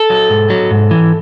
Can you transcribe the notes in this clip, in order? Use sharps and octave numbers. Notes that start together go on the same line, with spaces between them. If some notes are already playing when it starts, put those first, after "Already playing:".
Already playing: A4
F#3
G#2
F#3
G#2
E3